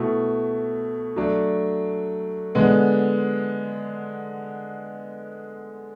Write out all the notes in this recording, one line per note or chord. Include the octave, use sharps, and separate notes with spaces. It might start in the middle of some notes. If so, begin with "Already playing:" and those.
Already playing: B2 A3 E4
F#3 A3 D4
D3 G#3 B3